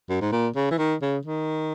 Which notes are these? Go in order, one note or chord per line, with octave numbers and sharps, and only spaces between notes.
F#2
G#2
A#2
C#3
E3
D#3
C#3
D#3